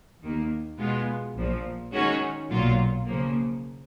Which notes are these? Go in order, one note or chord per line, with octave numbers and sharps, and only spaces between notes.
D#2 D#3 A#3
B2 G#3 B3 F4
A#1 A#2 F3
D#3 G#3 C#4 F#4 C#5
B1 A#2 F#3 A#3 F4
C#3 F3 A#3